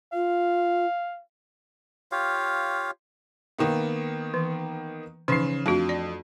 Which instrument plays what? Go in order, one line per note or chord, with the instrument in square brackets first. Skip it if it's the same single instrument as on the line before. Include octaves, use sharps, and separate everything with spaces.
[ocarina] F4 [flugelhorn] F5
[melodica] F4 G4 C#5 F5
[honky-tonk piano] D#3 A#3 B3
[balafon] E3
[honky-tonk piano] C#3 C7 [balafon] E3 F3 D#4
[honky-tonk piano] F2 [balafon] A3 D4 F#4
[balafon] D5